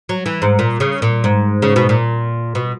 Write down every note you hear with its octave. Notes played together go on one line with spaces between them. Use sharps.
F#3
E3
G#2
A#2
C#3
A#2
G#2
C#3
B2
A#2
B2